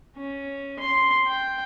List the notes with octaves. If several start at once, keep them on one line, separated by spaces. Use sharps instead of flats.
C#4
C6
G5